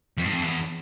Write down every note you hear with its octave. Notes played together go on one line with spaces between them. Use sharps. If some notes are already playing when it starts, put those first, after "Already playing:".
F2
G2
F2
E2